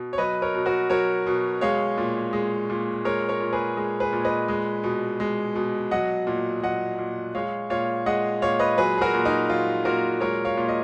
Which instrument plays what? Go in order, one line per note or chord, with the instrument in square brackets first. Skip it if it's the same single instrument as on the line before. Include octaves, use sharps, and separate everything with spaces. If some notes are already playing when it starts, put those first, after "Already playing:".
Already playing: [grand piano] B2
C#5
F#3 B4 D#5
A#4 C#5
B2
F#4 A#4
F#3 A#4 C#5
B2
G#3 C#5 F5
A#2
G#3
A#2
G#3 A#4 C#5
A#4 C#5
A#2
G#4 B4
G#3
G#4 B4
A#2
B4 D#5
G#3
B2
G#3
B2
F#3 D#5 F#5
A#2
F#3 D#5 F#5
A#2
G#3 C#5 F5
A#2 C#5 F5
G#3 D#5 F#5
A#2 C#5 F5
B4 D#5
F#3 G#4 B4
G#4
F#4 A#4
A#2
D#4
F#3 F4
A#2 F#4 A#4
G#3 A#4 C#5
C#5 F5
A#2
D#5